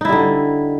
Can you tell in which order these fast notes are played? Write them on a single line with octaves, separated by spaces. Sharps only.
D#4 E4 G3 D3